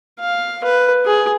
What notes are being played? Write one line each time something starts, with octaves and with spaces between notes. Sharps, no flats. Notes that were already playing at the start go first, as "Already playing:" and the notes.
F5
B4
G#4